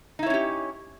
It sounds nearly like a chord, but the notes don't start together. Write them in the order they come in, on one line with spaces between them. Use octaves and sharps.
D#4 E4 C#5 C#4 G4